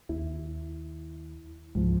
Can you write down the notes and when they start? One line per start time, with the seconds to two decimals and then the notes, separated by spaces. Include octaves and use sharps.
0.09 D#2 E4
1.75 C#2 G#2 F3